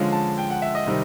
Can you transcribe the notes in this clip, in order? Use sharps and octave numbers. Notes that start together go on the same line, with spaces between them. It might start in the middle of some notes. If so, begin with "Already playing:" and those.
Already playing: D3 F3 G#3 C#4 F4
A5
G5
F#5
E5
D#5
C3 D#3 G3 C4